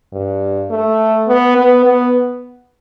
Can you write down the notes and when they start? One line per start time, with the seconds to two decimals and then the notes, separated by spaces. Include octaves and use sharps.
0.13 G2
0.70 A3
1.28 B3
1.57 B3
1.85 B3